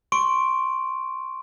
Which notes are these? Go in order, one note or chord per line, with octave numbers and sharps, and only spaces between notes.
C6 C#6 D7